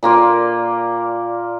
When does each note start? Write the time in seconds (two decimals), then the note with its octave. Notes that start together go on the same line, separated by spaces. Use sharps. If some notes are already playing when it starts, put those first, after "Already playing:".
0.03 A#2 A#3 F4 D5